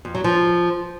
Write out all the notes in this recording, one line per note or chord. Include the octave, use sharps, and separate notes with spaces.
F2
F#3
F3